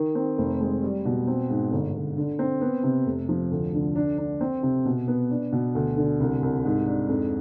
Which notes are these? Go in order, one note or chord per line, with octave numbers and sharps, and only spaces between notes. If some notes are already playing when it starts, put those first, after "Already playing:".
Already playing: D#3
C4
F1
G#3
G3
B2
C4
G#2
G1
G1
D3
C4
B3
C3
F1
F3
D2
D3
D4
D4
C4
C3
B2
B3
D4
B2
D2
D3
C2
C2
G#2
D4
F2